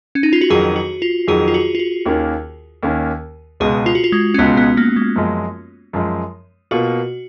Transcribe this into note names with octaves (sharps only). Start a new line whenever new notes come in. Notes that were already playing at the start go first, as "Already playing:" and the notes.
C#4
D#4
F4
F#4
F2 D#3 F#3 G#4
F#4
F4
F2 D#3 F#3 G#4
F4
F#4
F4
F#4
D#2 D#3 A#3 C#4
D#2 D#3 A#3 C#4
C#2 B2 G#3 G#4
F4
F#4
F4
G#3
C#4
C#2 B2 G#3 B3
B3
A#3
G#3
F#2 F3 G#3
F#2 F3 G#3
B2 A#3 F4 F#4